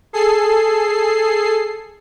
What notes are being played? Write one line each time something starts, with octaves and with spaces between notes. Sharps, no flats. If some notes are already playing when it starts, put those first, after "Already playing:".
G#4 A4 C7